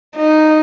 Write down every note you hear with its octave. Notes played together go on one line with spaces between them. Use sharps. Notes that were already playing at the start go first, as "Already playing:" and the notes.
D#4